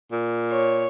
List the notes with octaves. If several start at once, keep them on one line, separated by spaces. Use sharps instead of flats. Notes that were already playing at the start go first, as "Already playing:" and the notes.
A#2
C#5